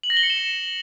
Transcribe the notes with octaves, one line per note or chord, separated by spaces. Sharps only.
F#7
A#6
G7
C#7
E7